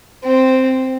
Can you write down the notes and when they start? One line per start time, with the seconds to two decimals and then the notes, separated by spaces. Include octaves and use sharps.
0.24 C4